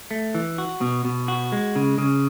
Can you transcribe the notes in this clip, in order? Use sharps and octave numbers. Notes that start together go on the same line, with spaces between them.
A3
E3
F#4
B2
B2
F#4
G#3
C#3
C#3